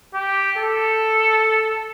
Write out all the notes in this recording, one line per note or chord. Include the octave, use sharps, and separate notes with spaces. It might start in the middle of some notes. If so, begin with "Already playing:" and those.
G4
A4